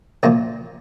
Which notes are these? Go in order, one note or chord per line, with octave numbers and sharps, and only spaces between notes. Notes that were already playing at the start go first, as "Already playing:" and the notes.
C2 A#2 F3 A#3